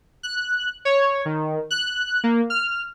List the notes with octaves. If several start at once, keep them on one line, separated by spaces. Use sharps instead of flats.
F#6
C#5
D#3
F#6
A#3
F6